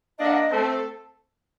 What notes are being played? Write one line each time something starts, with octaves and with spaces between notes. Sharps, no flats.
A#3 D4 D#5
F#5
D#5
A3 C4 A4